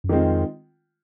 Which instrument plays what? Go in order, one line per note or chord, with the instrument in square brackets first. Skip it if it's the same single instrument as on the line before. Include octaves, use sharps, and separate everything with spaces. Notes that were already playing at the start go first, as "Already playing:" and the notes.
[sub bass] F#2
[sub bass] F2 [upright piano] D#3 G#3 C4 F4